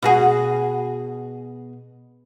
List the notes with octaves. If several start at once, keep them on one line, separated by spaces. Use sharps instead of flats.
B2 F#4 G#4